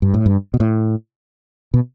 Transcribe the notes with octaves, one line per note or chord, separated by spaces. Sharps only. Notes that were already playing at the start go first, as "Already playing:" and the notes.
G2
A2
G2
B2
A2
B2